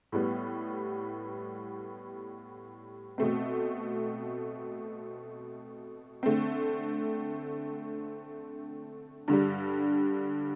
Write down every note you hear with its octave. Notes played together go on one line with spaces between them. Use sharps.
A2 G3 B3
B2 A3 C4
D3 A3 C4
G2 D3 G3